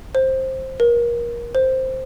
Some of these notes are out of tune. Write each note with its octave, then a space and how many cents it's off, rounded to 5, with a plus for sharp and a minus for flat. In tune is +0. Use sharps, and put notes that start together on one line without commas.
C5 +10
A#4 +30
C5 +0